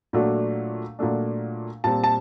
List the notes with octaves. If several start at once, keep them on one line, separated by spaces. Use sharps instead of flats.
A#2 F#3 A3 D4
A#2 F#3 A3 D4
A#2 G3 C4 A5
A5